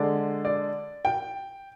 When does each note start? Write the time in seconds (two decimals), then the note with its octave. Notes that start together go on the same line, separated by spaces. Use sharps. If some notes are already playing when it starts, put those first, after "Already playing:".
Already playing: D3 G#3 D5
0.45 D5
1.05 G5